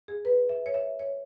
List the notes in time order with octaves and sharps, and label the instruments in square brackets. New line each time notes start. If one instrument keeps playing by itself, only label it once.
[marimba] G#4
B4
E5
C#5
E5
C#5